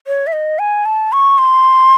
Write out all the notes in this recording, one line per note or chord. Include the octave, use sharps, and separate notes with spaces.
C#5
E5
D#5
G#5
A5
C#6
C6